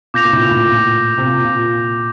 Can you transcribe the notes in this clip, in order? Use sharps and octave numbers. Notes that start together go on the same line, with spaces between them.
A#2 D6 G6 A#6 F7
A#2
A2
A#2
A2
A#2
C3
A#2
A#2